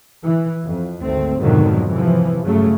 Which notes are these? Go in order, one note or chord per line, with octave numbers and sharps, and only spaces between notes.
E3
F2
G#1 D2 A3 C4
F2 G#2 B2 D3 D#3 F#3
C3 E3 F3
G2 C#3 F#3 A3